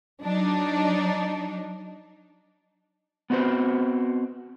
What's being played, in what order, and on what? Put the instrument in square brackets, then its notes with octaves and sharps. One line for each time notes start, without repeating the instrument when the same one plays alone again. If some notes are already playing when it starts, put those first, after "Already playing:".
[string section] F#3 D4 D#4
[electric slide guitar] B3 C4 F#4 B4 C5